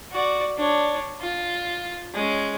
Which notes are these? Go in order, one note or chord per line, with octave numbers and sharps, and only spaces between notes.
F#4 D5
D4 C#5
F4
G#3 C#4